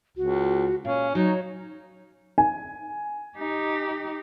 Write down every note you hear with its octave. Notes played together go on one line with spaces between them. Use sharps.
C#2 F#4
A#2 C#4 F5
F#3 D#4 C#5
G#5
D#4 G4